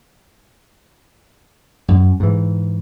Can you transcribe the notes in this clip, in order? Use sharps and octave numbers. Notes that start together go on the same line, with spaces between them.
F#2
G#2 E3